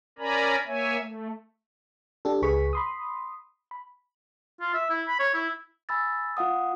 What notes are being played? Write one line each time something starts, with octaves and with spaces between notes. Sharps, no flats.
C#4 A#4 D5 G#5 A#5 B5
A#3 C#5 E5 G#5
A3
D4 G4 A4
C#2 G#4 B4 C#6 B6
B5 C6 D#6
B5
F4
E5
E4
B5
C#5
E4
G#5 B5 E6 A6
F4 F5 F#5 D#6